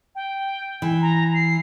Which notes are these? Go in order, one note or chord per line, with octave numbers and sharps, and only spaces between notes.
G5
E3
A#5
C7